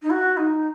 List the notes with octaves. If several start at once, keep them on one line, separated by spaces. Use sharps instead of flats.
D#4
F#4
D#4